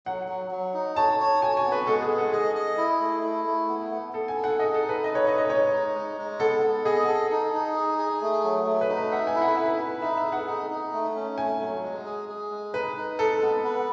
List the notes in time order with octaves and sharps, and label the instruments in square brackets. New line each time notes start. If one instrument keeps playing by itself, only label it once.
[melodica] F#3 [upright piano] F#5
[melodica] F#3
F#3
D#4
[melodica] C#5 [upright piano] A5
[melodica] C#5
[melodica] F#4 [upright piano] G#5
[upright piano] G#5
[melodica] B3
[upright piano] B4
[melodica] G#3 [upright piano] A4
[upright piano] G#4
[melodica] G#3
[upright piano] A4
[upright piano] G#4 [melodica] D#5
[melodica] D#5
E4
A3
E4
A3
B3
B3
[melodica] B3 [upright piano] A4
[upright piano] G#5
[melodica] A4
[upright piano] F#5
[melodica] G#4 [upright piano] D#5
[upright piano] A4
[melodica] D#4
[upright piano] B4
[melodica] B4 [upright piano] D#5
[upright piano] C#5
[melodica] D#4 [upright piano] D#5
[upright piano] D#5
[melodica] G#3 [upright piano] C#5
[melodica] D#4
G#3
G#3
[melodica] B3 [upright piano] A4
[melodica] B3
[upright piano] G#4 [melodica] D#5
[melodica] A4
D#4
D#4
G#4
G#4
A3
F#3
A3
[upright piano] B4
[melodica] D#4
[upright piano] B4
[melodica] E5 [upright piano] F#5
[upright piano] G#5
[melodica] E4
[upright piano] F#5
[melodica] B4 [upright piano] E5
[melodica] B4
[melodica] D#4 [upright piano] E5
[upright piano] E5
[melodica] G#4
[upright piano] F#5
[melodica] D#4
D#4
A3
C#4
[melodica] A3 [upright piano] G#5
[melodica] F#3
G#3
G#4
G#4
G#3
[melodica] D#4 [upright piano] B4
[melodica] D#4
[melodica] G#3 [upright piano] A4
[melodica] B3
B4